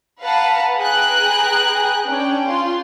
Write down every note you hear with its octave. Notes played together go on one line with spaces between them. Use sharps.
B4 F5 F#5 A5 A#5
G#4 B4 G5 A#5 F#6
C#4 D4 G5
F4 C6